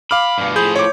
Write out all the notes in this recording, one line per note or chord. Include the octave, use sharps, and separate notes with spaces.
F5 B5 D6 F6
G2 B2
A2 F3 G#4 B5 G6
C#5 D6